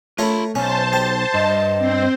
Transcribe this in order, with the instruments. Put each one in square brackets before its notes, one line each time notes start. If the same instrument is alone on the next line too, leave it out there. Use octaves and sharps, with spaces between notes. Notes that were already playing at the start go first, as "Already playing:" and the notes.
[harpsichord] A3 A#4 C#5 [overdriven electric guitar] F4 B5
[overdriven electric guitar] B1 [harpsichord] C#4 [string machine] C5 A5
[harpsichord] G4
[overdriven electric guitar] G2 [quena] D#5
[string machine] C4 C5